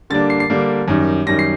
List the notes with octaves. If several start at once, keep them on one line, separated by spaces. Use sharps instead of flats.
D3 G3 A#3 D4 A6
C7
C7
D3 G3 A#3 D4
F#2 D#3 G3
F#2 D#3 G3 A#6
C7